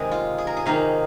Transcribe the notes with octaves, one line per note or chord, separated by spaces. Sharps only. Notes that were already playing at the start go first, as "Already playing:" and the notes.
Already playing: C3 D#3 G#3 D#4 G#4
F4
G#4
A#4
G#4
C3 D#3 A#3 D#4 F5